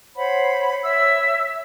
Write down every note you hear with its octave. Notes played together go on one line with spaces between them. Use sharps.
C5 C#5 F#5 B5
C#5 E5 E6